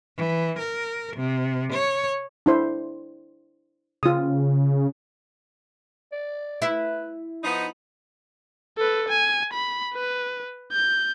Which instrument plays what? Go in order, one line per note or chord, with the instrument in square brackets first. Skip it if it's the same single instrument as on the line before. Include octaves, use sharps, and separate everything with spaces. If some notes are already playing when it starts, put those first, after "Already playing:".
[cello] E3
A#4
C3
C#5
[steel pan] D4 E4 C5
[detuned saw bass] C#3 [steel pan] F4 D#6
[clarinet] D5
[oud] E4 [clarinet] B4
[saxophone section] F3 B3 D#4 [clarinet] B5
[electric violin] A4 B4
G#5
B5
B4
G6